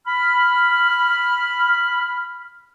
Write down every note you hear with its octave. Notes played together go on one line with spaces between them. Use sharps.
B5 F6